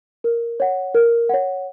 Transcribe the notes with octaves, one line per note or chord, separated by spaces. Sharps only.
A#4
C#5 F#5
A#4
C#5 F#5